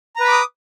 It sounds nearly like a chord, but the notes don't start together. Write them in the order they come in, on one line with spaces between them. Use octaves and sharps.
A#5 B4 B5 D6 D#6